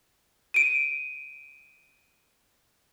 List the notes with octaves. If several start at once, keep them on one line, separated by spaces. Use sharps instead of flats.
D7 D#7